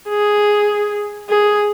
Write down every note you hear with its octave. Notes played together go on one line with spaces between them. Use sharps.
G#4
G#4